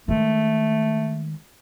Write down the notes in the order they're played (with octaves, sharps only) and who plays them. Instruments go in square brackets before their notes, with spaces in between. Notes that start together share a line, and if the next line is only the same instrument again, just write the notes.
[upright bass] D#3 G#3 [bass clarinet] A3